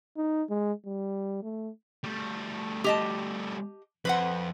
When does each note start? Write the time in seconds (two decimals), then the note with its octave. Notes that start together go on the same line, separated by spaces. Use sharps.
0.17 D#4
0.50 G#3
0.86 G3
1.43 A3
2.04 G3 A3
2.84 G4 D#5 A5
4.05 F2 B4 C5 F#5